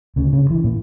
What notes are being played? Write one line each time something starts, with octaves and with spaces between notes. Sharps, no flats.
D2 C#3
C#3
E3
A#2